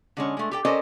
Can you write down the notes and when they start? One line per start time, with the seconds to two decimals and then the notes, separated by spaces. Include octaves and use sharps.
0.17 D3 G#3 C#4
0.37 G#3 A3
0.51 G4 A4 G5
0.65 C#4 A4 A#4 C5 D5 D#5